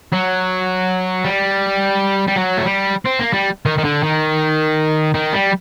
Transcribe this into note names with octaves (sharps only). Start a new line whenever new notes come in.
F#3
G3
G3
F#3
A3
G3
C4
A#3
G3
D#3
D#3
D3
D#3
D#3
G3